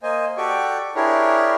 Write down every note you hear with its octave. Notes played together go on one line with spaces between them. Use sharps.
A#3 C5 D#5 G#5
F#4 G4 A4 D5 G5 C#6
D4 E4 G4 G#4 A#4 C#5